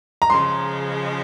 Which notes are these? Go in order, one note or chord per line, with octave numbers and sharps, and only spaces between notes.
A#5
C#3 F3 G#3 C6